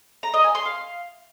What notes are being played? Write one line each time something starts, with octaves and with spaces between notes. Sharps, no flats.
A#5
D#5
G#5
C6
F5